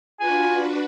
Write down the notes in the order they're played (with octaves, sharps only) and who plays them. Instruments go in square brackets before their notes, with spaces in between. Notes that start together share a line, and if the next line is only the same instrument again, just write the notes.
[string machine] D4 F#4 B4 [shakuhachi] F4 [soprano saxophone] G#5